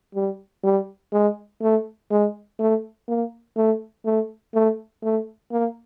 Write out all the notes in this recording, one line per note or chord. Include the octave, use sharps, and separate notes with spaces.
G3
G3
G#3
A3
G#3
A3
A#3
A3
A3
A3
A3
A#3